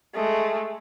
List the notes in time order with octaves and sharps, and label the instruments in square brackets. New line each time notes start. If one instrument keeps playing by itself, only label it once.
[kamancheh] G#3 A3